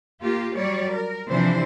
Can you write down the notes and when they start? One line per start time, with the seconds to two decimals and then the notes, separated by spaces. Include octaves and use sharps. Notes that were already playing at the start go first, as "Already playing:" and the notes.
0.21 A#3 F4 G4
0.55 F#3 G3 C#5 D5
0.92 A#4
1.29 C3 E3 F3 D4 C5